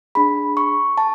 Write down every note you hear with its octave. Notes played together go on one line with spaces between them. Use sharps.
D4 G#4 B5
C#6
A5